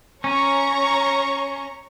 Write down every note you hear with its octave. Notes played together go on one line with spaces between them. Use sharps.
C#4 C#5 A#5 C#6